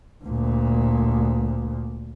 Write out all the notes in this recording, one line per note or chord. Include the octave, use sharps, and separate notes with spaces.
D2 A#2